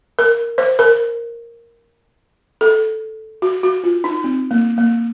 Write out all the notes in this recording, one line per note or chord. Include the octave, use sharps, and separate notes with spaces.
A#4
C5
A#4
A4
F#4
F#4
F4
D#4
C4
A#3
A#3